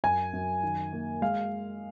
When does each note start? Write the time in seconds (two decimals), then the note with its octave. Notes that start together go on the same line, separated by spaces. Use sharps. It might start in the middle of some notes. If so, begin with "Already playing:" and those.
0.04 F#2 G#5
0.33 F#2
0.63 D#3
0.93 A#3
1.22 G#3 F5